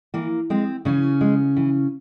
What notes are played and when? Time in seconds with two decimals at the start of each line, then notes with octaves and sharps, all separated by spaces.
0.14 E3 A#3
0.50 G#3 C4
0.85 C#3 E3 C#4
1.21 G#3
1.57 E3